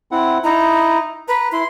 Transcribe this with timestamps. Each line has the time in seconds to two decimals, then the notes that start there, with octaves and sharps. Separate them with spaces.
0.11 C4 E4 F#5
0.44 D#4 E4 A#5
1.28 B4 A#5
1.52 E4 C6